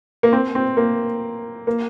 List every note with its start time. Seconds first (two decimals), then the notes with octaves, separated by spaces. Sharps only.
0.23 A#3
0.32 C4
0.55 C4
0.77 A#3
1.67 A#3